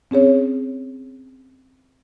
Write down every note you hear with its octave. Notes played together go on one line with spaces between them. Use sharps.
C4 C#4 G#4 C#5